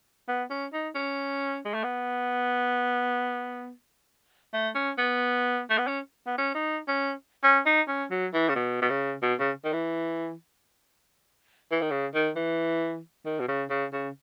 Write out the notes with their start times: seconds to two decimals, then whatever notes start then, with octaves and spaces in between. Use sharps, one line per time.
0.28 B3
0.50 C#4
0.73 D#4
0.95 C#4
1.65 G#3
1.74 A3
1.84 B3
4.53 A3
4.75 C#4
4.98 B3
5.70 A3
5.78 B3
5.87 C#4
6.27 B3
6.38 C#4
6.54 D#4
6.88 C#4
7.44 C#4
7.66 D#4
7.88 C#4
8.11 F#3
8.34 E3
8.49 C#3
8.55 B2
8.82 B2
8.90 C#3
9.22 B2
9.40 C#3
9.64 D#3
9.73 E3
11.71 E3
11.82 D#3
11.91 C#3
12.14 D#3
12.36 E3
13.25 D#3
13.39 B2
13.48 C#3
13.70 C#3
13.93 C#3